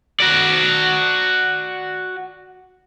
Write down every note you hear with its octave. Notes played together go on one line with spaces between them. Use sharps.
F#4 D5